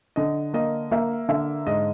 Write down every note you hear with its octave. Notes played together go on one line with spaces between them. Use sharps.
D3 D#5
A#3 D#5
A#3 E5
D3 E5
G#2 D#5